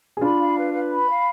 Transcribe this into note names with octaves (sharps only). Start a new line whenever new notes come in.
G#4
D4 F4 B5
F5
B4
B4
B5
F5